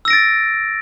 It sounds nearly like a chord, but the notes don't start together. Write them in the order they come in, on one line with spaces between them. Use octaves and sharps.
E6 A#6 D7 A6